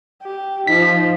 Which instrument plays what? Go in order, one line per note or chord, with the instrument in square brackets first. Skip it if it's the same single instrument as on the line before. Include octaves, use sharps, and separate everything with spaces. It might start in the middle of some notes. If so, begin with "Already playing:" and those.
[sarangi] G4
[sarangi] F3 [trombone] D#4 [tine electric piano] B6